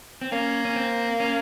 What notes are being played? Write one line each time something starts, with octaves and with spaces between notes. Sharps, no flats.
C4
A#3 C#4
C#4
C4
C#4